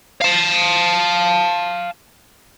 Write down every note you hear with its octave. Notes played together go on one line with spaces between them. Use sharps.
F5 A5